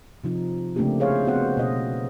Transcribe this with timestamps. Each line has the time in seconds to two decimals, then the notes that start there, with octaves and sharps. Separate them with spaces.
0.24 C3 F3 D#4
0.76 C#3 A3 A#3 C4 D4 G4
1.00 G#4 C5 C#5 F5
1.25 B3 C4 F#4 C5 F#5
1.57 B2 D#4 D#5